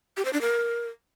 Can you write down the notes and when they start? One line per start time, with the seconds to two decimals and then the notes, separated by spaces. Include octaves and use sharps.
0.17 G4
0.25 C5
0.33 D4
0.41 A#4